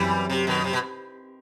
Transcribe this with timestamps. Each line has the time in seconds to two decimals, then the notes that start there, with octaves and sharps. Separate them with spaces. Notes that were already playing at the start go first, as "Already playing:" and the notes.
Already playing: F#2 E3 F#3 G3 C4
0.30 C3
0.47 B2 D#3
0.64 C3
0.73 B2